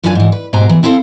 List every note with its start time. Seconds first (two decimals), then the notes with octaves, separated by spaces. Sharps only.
0.03 F#2 E3 D4 F4 A#4 G#5
0.15 G#2 E3
0.32 B4
0.53 G#2 B2 G4 C5 G#5 A#5
0.69 E3
0.83 C4 E4 A4 C5 F5